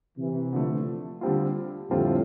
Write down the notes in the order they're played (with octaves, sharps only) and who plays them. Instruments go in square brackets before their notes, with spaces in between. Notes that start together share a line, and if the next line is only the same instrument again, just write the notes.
[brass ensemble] C3 E3
[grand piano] D3 F3 A3
D3 G3 C4 F4
[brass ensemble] F2 A2 [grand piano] D3 G3 C4 F4